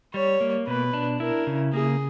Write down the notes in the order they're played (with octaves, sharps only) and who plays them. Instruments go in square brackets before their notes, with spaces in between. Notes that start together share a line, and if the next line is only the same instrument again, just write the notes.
[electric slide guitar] G3 [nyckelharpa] C#5
[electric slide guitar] A#3
[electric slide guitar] B2 [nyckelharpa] B4
[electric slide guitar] D4
[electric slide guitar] E4 [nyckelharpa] A#4
[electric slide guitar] C#3
[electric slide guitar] A#3 [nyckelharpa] G#4